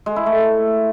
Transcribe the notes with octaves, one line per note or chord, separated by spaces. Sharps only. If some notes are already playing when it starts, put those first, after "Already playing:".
G#3
E4
A3